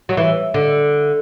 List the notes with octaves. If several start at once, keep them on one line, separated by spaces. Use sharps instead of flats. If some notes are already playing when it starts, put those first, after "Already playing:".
F#3
E3
D3